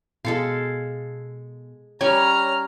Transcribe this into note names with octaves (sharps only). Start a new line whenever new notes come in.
B2 G#3 A4 F5
G3 C#4 C#5 G#5 A#5 F6